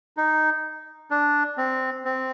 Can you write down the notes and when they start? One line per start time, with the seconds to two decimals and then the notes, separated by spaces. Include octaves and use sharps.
0.17 D#4
1.11 D4
1.57 C4
2.05 C4